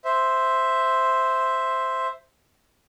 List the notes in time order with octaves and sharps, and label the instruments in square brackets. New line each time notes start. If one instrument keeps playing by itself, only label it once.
[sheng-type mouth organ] C5 E5